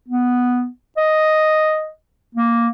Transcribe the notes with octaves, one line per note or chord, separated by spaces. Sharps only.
B3
D#5
A#3